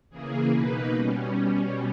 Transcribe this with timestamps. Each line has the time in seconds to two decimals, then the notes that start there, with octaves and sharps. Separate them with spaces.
0.10 C#3 E3 A#3 G#4
0.51 B2 A#3 D#4 B4
0.93 B2 G3 C#4